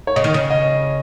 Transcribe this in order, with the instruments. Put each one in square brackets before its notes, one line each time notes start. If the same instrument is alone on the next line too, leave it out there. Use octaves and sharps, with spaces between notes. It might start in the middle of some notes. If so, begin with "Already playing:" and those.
[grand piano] C#5
[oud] C#3 [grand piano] D#5
[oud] D#3
C#3
[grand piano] D#5